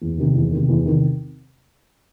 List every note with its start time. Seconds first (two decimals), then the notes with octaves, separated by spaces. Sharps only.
0.02 E2
0.18 C3 D#3
0.35 E2
0.51 D#3
0.57 C3
0.69 E2
0.86 C3 D#3